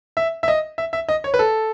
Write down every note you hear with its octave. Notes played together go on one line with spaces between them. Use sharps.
E5
E5
D#5
E5
E5
D#5
C#5
B4
A4